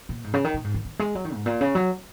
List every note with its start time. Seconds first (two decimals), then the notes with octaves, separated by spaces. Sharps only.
0.09 A#2
0.24 G#2
0.34 C#3
0.44 D#3
0.54 A#2
0.64 G#2
0.74 D#3
0.85 D#3
0.99 G#3
1.15 F#3
1.25 D#3
1.34 G#2
1.46 A#2
1.61 C#3
1.75 F#3